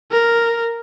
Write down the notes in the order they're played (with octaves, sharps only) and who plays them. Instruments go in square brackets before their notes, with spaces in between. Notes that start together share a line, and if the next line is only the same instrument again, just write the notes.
[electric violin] A#4